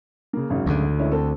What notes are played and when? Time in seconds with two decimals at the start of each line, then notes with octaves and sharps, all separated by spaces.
0.33 C#3 A#3
0.50 G#1 F#2 C#3
0.66 D2 D3
0.99 G#3 C#4 E4
1.11 C4 A4 C5